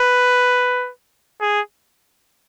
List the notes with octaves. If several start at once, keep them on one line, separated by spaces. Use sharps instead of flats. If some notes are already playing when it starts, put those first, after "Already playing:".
Already playing: B4
G#4